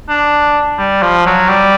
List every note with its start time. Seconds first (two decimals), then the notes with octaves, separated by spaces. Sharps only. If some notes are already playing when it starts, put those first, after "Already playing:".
0.09 D4
0.78 G3
1.02 F3
1.26 F#3
1.49 G3